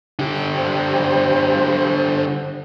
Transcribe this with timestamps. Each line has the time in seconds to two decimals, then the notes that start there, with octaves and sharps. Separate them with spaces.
0.19 D3 G4
0.55 C5